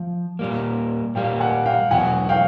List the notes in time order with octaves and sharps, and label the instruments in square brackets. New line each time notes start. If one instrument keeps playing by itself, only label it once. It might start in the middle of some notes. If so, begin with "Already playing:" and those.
Already playing: [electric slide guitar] F3
A#2 G3 A#3
[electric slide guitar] A#2 G3 A#3 [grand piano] F5 G5
[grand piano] F#5 G#5
F5 G5
[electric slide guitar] E2 B2 F#3 [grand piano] F#5 G#5
[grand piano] F5 G5